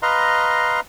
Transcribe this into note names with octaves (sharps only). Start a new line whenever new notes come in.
B4 D#5 F5 A#5 C6